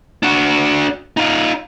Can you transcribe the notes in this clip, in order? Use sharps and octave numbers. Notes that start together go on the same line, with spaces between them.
D4 F#4
D#4 F4